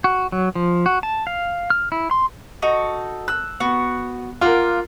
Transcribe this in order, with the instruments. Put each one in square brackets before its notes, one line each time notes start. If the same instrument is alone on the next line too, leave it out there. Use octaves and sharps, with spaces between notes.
[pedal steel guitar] F#4
F#3
F3
F#4
A5
F5
F6
E4
C6
[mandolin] D#4 F#4 A4
[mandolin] E6 [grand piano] F#6
[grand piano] B3 [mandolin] F#4
[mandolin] A#3 F#5 F6 [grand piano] F4 A#4